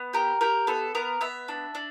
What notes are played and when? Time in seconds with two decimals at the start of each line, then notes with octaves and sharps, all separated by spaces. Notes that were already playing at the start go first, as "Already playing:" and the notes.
Already playing: B3
0.13 G4 A#4
0.41 G4 A#4
0.67 B3 A4
0.95 B3 A#4
1.21 B3 E5
1.48 D4
1.75 D4